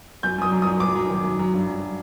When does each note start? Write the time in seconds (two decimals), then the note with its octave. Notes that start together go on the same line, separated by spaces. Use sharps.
0.23 F#2 G6
0.38 F#2 D#6
0.52 F#3
0.62 F#3 D#6
0.80 F#3 D6
0.96 F#3
1.09 D#3
1.24 F#2
1.39 F#3
1.53 G2
1.67 F#3